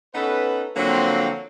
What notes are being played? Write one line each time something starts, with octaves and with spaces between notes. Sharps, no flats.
B3 C#4 D#4 A4 B4
D3 F3 F#3 A#3 C4